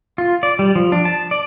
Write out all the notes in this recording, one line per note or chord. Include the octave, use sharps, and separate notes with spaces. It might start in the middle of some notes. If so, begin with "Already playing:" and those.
F4
D5
G3
F3
D4
A5
D5